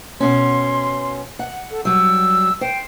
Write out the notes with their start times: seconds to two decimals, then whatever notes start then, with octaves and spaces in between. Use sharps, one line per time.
0.20 B2 C#4 C6
1.39 F#5
1.71 A4
1.85 F#3 G3 E6
2.61 C5 G5